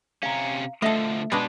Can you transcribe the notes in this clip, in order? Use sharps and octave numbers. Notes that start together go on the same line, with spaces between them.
C3 C#4 F5 A#5
D3 F3 A3 A4 D#5 E5
B2 G3 G#3 D4 B4